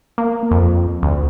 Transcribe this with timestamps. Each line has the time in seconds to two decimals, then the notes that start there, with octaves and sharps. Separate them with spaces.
0.18 A#3
0.51 F2
1.03 D2